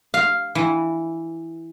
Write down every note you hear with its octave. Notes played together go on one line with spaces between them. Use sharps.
F5
E3